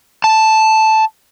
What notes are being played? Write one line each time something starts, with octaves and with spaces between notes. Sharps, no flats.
A5